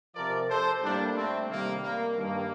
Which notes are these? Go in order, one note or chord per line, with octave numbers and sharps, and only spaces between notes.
C3 F3 A#4 D5
A4 C5
A2 G3 A#3 D4
A3 C4
C3 D#3 G3 A#3
A#3
G2 D#3 G3 A#3